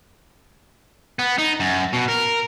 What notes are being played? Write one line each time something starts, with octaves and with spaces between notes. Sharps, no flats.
B3
D#4
F#2
B2
A#4